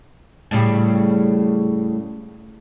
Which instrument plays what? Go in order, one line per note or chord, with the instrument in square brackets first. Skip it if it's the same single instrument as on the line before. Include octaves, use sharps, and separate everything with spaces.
[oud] A2 C#3 G3